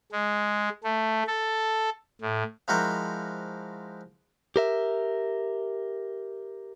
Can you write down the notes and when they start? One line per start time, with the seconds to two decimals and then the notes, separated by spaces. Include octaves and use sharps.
0.12 G#3
0.84 A3
1.27 A4
2.22 A2
2.68 F3 G#3 E4 F#4 A#4 C5
4.56 G4 A#4 E5